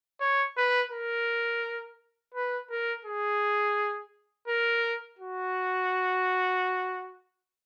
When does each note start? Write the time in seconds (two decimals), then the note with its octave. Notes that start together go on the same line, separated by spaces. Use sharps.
0.20 C#5
0.57 B4
0.92 A#4
2.35 B4
2.70 A#4
3.05 G#4
4.48 A#4
5.19 F#4